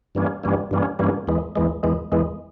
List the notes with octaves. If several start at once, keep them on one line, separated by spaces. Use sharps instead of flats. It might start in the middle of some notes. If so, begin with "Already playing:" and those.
G2 E3 G3 A#3 C#4
G2 E3 G3 A#3 C#4
G2 E3 G3 A#3 C#4
G2 E3 G3 A#3 C#4
E2 E3 G#3
E2 E3 G#3
E2 E3 G#3
E2 E3 G#3